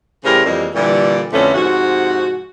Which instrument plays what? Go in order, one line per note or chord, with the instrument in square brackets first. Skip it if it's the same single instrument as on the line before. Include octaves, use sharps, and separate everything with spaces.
[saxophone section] A2 C#3 G3 G4 A#4 C5
F2 E3 G3 G#3 A#3
A#2 D3 E3 G3
F2 A2 D3 A3 B3 C#4
G#2 C3 F3 F#4